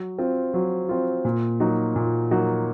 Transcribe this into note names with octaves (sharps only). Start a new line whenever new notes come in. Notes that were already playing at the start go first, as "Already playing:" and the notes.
Already playing: F#3
C4 F4
F#3
C4 F4
A#2
F#3 A#3 D#4 F#4
A#2
F#3 A#3 D#4 F#4